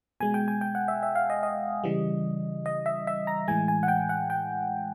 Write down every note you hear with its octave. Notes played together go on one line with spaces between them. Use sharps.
B2 G#3 G#5
G5
G#5
G5
F#5
E5
E5
F5
D#5
D#5
C#3 E3 G3
D#5
E5
E5
A#5
A2 E3 G#3 G#5
G#5
F#5
G5
F#5
G5